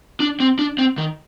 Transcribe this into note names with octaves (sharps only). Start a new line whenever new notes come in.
D4
C4
D4
C4
D#3